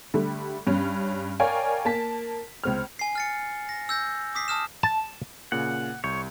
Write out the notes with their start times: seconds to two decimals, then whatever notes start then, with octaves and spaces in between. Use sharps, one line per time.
0.14 D3 G3 A3
0.67 G2 C#4
1.40 A#4 C#5 D5 F5 G5 G#5
1.85 A#3 A5 B6
2.64 C#2 C4 F6
2.99 G#5 C7
3.15 F6 A6 C#7
3.69 A#6
3.89 E6 G6 A#6
4.35 D6 D#6 B6 C7
4.48 A5 D#6 F6 E7
4.83 A5
5.52 A#2 C#3 F#5
6.04 C2 C#5 G6